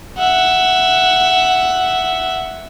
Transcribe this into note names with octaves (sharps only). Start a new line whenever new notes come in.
E5 F#5